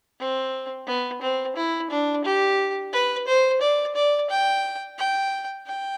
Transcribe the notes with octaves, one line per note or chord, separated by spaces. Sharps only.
C4
B3
C4
E4
D4
G4
B4
C5
D5
D5
G5
G5
G5